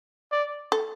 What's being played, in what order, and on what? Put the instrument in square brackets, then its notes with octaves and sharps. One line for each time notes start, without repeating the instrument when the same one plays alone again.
[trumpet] D5
[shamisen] A4